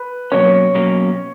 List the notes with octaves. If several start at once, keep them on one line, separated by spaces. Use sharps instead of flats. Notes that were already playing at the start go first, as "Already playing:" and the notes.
Already playing: B4
B2 F#3 A#3 C#4 C#5
B2 F#3 A#3 C#4